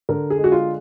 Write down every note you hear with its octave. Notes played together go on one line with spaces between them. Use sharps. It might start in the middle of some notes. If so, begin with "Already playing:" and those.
D3 A#4
G#4
G#3
F#4
F4